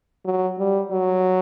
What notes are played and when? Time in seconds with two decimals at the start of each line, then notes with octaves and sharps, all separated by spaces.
0.25 F#3
0.59 G3
0.91 F#3